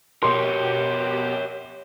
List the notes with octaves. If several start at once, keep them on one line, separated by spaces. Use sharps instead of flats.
B2 G4 A#4 C#5 C6